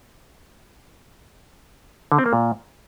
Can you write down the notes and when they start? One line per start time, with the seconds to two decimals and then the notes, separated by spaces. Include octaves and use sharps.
2.12 D3
2.19 C4
2.26 A#3
2.33 A#2